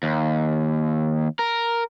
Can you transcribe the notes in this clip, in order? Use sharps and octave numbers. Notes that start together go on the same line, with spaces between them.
D#2
A#4